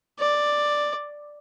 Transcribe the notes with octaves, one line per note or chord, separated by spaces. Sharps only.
D5